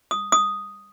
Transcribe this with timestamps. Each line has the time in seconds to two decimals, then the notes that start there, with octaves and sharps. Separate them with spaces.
0.11 D#6
0.32 D#6